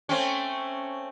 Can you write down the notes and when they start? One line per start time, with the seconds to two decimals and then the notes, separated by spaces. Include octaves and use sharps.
0.09 A3 C4 C#4